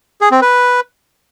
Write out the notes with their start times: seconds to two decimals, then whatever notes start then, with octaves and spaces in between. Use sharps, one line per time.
0.21 G#4
0.31 C4
0.42 B4